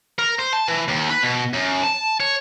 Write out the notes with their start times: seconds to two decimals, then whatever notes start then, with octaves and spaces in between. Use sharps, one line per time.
0.19 A#4
0.39 C5
0.53 A5
0.68 E3
0.88 D#2
1.10 B4
1.22 B2
1.54 F#2
1.84 A5
2.20 C#5